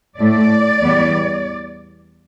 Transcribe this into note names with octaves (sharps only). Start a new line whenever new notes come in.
A2 A3 D5
E2 E3 G3 B3